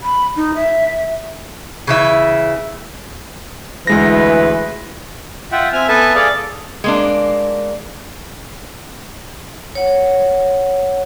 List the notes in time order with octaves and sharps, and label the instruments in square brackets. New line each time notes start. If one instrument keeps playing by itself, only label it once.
[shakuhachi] B5
D#4
E5
[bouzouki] C#3 E3 E5
[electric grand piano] D2 G#3 A#6 [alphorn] E3 [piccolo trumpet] B4
[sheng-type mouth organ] F4 E5 F#5 G5
C4 E5 G#5 F6
B3 A4 B4 E5 G#5 A5
G#4 A4 D5 F5
[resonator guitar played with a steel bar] G#3 A#3 D4
[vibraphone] C#5 F#5